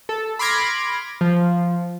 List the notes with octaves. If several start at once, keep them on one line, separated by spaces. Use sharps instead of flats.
A4
B5 C6 D6 F6 G#6 A#6
F3